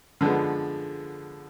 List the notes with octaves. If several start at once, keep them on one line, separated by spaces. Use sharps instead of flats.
D3 F3 G#3 B3